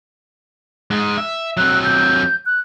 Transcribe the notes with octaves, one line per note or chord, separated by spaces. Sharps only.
G#2 G#3
E5
F#3 C4 F#6
G6
F#6